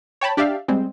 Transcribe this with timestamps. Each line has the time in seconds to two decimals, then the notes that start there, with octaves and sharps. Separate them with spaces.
0.21 C#5 G5 A5 B5
0.37 D4 G4 D5 E5 F5
0.68 G3 G#3 C4